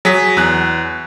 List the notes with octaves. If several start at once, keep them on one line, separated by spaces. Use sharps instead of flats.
F#3 G#4 B6
E2 F#6